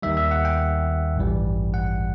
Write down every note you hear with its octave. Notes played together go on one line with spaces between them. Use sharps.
D#2 D#3 G3 E5
E5
F#5
G5
A1 G2 E3 G3
F#5